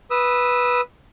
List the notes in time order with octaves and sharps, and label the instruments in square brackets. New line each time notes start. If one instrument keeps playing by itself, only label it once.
[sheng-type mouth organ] B4 D#6 E6